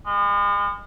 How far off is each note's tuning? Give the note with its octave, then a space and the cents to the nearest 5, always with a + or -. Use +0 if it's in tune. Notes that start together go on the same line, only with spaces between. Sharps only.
G#3 -40